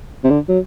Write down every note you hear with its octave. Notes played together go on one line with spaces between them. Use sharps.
C3
D3
F#3